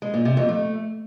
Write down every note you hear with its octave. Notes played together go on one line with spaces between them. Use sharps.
G#3
A#2
C3
F2
A3